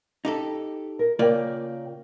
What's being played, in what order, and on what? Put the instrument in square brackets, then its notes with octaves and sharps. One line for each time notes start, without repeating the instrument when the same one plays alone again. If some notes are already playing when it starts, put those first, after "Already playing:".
[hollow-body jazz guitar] D#4 G4 A4
[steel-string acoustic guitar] A#4
[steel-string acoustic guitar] C#3 A#4 G5 [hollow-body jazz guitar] A#3 F4 D5